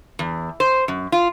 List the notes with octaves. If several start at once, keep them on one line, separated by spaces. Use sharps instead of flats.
E2
C5
F#2
F4